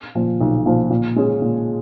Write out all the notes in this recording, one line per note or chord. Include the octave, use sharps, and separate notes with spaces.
A#2 F3
B1
A#2 F3
A#2
G#3 C#4 G#4
A#2